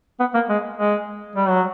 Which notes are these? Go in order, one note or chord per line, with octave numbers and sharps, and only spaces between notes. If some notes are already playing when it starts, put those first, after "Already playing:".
B3
A#3
G#3
G#3
G3
F#3